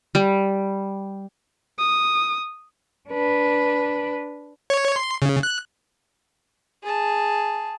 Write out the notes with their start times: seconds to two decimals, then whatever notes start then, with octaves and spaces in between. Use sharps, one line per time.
0.15 G3
1.79 D#6
3.09 D4 B4
4.70 C#5
4.96 C6
5.22 C#3
5.43 F#6
6.83 G#4 A5